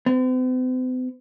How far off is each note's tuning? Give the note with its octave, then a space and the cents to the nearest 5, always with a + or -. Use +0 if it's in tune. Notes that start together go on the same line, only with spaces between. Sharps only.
C4 -45